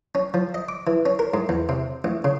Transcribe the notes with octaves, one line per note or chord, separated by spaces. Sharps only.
C#4
F3
D#5
D6
E3
C#4
A#4
G#2
E2
C3
A1
C#3